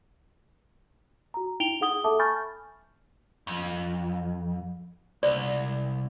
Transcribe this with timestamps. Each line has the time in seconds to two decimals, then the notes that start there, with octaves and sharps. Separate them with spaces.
1.34 F#4 A#5
1.60 D#4 E4 G5 D7 F7 G7
1.81 D#4 G#4 F#5 D#6 G7
2.04 A4 E5 A5 D6 D#6
2.19 G#5 B5 C#6 F6 G6 A6
3.47 F2
5.23 C2 D5